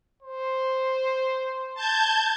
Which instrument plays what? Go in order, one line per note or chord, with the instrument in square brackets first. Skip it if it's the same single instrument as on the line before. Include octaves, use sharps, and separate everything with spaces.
[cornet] C5
[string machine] A5 G6 G#6